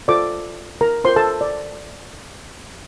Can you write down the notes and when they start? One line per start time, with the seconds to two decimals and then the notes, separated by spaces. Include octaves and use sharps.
0.08 F4 A4 C5 D5 D6
0.81 A#4 A#5
1.04 F4 C5 C6
1.09 A#4
1.16 A4 A5
1.41 D5